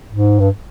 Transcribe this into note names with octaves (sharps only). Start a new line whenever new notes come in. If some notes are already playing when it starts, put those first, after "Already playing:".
G#2
G2